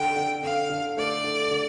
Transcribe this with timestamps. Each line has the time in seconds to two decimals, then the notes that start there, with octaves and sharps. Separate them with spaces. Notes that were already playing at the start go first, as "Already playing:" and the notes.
Already playing: D3 G5
0.16 D3
0.43 D3 F5
0.70 D3
0.97 A3 D5
1.24 D3
1.51 D3